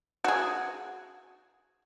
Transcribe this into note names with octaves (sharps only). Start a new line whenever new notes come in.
F#4 G#4